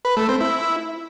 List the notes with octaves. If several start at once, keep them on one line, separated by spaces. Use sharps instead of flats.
B4
A3
C4
E4